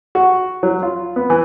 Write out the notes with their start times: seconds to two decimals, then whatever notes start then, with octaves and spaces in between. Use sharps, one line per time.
0.15 F#4
0.63 F#3
0.83 F4
1.16 B3
1.30 E3